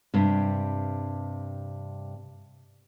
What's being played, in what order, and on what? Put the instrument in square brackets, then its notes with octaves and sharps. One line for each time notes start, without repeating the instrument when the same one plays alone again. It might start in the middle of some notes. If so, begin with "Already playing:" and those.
[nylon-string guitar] G2 C3